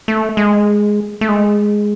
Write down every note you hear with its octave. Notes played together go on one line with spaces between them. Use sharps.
A3
G#3
A3
G#3